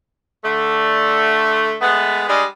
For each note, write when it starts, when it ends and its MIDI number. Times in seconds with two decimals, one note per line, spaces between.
0.44 1.75 50
0.44 1.75 57
1.81 2.25 56
1.81 2.25 57
1.81 2.25 59
2.28 2.44 55
2.28 2.44 56
2.28 2.44 62
2.28 2.44 68
2.28 2.44 75